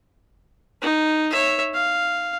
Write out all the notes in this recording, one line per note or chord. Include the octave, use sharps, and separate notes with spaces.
D#4
C#5 E5
F5